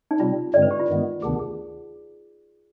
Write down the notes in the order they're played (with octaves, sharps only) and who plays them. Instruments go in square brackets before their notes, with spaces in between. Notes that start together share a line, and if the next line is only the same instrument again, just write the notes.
[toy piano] D#4
[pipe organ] C3 G3 C4 [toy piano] F4
[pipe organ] G2 D3 G#3 C4 [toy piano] D5
[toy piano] B4
G4
F4
[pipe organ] G2 D#3 G#3 B3
[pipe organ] D2 C3 D#3 B3 D4 [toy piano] G#4
[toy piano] G#4